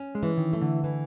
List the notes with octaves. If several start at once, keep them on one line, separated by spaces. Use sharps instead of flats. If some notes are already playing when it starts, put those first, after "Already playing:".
Already playing: C#4
G#3
E3
D#3
A3
D3
E3